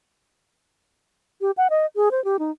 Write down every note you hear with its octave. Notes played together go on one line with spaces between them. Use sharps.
G4
F#5
D#5
G#4
C5
G4
D#4